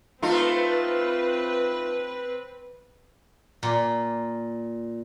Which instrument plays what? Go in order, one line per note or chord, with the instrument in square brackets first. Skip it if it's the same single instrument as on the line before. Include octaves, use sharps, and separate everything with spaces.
[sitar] A3 D#4 F4 [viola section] C4 B4
[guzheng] A#2